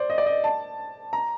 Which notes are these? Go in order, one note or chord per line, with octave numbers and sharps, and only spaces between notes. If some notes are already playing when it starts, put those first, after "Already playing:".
Already playing: C5 D5
D#5
D5
D#5
A5
A#5